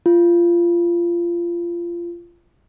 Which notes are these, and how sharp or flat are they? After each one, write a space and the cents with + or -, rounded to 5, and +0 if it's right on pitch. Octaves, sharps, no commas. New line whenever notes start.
F4 -20